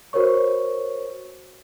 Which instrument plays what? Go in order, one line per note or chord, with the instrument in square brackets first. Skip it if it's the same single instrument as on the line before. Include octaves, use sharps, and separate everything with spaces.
[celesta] F#4 A#4 C5 C#5 C#6